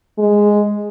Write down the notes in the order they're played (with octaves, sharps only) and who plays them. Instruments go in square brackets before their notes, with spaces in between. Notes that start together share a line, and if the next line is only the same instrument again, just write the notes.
[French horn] G#3